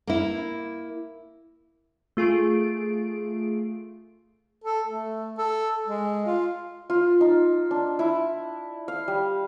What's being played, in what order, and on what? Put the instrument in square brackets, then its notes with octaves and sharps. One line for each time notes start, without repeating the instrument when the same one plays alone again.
[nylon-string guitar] A#3 E4
[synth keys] A3 F4 G#4 D7
[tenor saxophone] A4
A3
A4
G#3
F4
[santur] F4
D#4
D4
E4
F5
G3